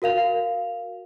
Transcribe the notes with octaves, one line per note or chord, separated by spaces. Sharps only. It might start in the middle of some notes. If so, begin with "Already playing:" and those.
F#4 A#4 F5 F7